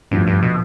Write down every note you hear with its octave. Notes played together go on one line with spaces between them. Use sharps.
D2 G2 D3 F3 B3
G2
B2